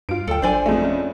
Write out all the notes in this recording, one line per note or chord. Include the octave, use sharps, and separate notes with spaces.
G2 F4 D7
D2 A4 G5
G#1 D4 C5 D5 G#5
F2 G#3 A3
C#4